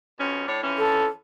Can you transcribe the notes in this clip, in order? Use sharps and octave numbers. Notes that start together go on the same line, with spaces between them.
F2 B2 C#4
A2 D4 C#5
F2 E3 C#4
A4